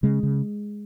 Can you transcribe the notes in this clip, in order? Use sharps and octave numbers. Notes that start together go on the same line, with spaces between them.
C#3 G#3
C#3